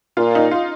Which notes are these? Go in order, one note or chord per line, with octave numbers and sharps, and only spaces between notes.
A#2 F4
D#4
F4